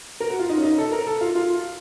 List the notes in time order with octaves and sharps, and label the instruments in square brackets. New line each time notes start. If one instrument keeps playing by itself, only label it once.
[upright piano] A#4
F#4
F4
D#4
C#4
D#4
A4
A#4
A4
F4
F4